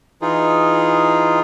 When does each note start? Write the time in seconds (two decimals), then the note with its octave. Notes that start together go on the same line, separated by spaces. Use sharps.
0.22 E3 D#4 F4 G#4